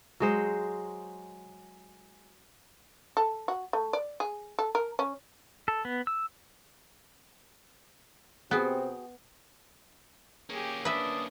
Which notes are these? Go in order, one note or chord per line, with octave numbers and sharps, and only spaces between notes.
F#3 G#3 C5
A4
F#4
A3
D5
G#4
A4
A#4
C#4
A4
B3
E6
C3 B3 C4 F#4 G#4 G5
A#3 C#4 G4 G#4
D4 B4 E5 D#6